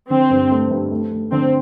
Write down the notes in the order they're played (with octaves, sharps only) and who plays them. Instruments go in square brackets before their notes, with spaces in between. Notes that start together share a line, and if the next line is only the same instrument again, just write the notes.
[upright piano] D3 [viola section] C4
[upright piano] G2
A3
G2
A3
A3
[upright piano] D3 [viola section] C4